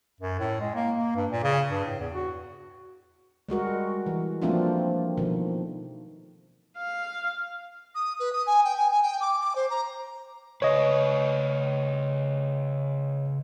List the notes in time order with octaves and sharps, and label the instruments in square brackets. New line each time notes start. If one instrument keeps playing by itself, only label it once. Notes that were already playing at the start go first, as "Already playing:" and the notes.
[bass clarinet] F#2
A2
G#3
A#3
A#3
G2
A#2
C#3
G2
A2
E2
F#4
[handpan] G3 G#3 F#4 A#4
E3
F3 A3 A#3 C4 D4 F4
B2 D#3 F3
[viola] F5
[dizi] D#6
B4
D#6
G#5
G5
G#5
G#5
G5
D6
D6
C5
A#5
[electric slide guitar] C#3 B4 [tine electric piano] C#5 D#5